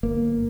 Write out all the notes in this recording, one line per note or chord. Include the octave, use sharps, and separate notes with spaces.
G1 A#3